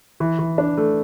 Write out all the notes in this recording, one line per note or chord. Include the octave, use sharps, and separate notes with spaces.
E3
E3
D4
A3